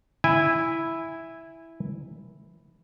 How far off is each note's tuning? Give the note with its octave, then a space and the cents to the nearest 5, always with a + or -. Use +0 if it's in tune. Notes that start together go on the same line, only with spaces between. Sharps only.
E4 +0 G#5 -20